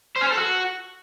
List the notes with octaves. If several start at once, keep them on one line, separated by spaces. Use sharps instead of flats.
C5
C#4
C5
A4
F#4